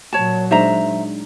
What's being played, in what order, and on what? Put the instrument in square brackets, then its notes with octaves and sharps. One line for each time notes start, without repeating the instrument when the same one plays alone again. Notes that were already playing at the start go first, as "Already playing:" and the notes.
[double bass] A#2 F#3 [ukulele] C#5 A5
[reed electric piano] G#3 D4 D#4 [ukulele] C5 E5 A#5